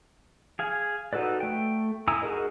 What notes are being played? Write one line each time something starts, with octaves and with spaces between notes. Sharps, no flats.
G#4 F5 G#5
D#4 F#4 A4 B4 D5
A3 G5
E4 G#5 A#5 D#6 E6
D#4 F#4 G#4 A#4 D#5